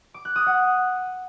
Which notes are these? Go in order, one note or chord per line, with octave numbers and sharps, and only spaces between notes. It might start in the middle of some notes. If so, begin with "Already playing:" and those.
D6
F#6
D#6
F#5